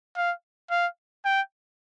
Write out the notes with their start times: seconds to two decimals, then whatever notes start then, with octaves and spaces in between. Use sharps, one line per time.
0.16 F5
0.70 F5
1.25 G5